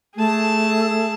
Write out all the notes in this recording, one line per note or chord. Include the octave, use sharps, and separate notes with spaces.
A3 G#4 A5